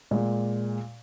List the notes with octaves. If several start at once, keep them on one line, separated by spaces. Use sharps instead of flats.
A#2 G#3